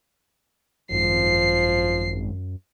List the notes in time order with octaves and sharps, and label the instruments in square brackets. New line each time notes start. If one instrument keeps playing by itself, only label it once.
[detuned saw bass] G#1 [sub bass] F#2 [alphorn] F3 [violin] C7